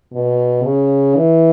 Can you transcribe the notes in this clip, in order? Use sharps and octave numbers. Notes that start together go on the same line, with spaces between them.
B2
C#3
E3